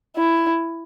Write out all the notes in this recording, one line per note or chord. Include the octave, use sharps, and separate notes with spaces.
E4